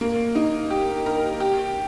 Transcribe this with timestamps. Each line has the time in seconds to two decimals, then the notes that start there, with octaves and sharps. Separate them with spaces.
0.01 A#3
0.35 D#4
0.70 G4
1.06 A#4
1.40 G4